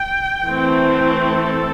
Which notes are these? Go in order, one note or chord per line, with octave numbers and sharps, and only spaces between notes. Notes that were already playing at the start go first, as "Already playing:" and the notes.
Already playing: G5
E3 A3 C4
A4